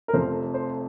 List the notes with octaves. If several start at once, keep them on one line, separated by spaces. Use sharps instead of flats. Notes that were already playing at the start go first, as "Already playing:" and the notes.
A#4
F1 F2 C3 C5
C5